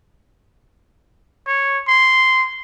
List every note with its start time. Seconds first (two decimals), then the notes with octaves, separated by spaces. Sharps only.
1.47 C#5
1.88 C6